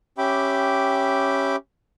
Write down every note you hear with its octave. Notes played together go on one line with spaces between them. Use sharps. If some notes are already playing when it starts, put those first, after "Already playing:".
C#4 G4 E5 G5 B5 D6